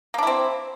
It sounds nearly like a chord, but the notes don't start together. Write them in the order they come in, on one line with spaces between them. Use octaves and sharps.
A#3 D4 E4 C4